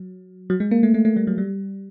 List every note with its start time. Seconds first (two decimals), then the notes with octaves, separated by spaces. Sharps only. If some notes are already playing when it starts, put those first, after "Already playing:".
Already playing: F#3
0.50 F#3
0.60 G#3
0.71 A#3
0.83 A3
0.94 A3
1.05 A3
1.16 G3
1.27 F#3
1.38 G3